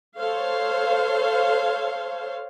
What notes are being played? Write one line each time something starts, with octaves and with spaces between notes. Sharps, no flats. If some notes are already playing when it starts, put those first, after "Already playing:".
A4 C5 C#5 F5